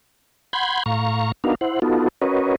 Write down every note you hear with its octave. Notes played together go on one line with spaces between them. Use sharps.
F#5 B5 C6 G6 G#6
A2 F5 A#5 C#6
B3 D4 D#4 F#4 A#4 F5
E4 C5 F#5
B3 D#4 F4 F#4 A4
C#4 F#4 A#4 B4 C#5 D#5